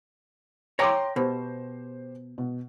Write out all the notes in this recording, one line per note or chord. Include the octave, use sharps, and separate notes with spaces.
C#5 G5 A#5 C6 D6 A#6
B2 G4 C5
B2